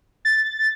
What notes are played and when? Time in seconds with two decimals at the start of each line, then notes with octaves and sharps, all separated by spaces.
0.25 A6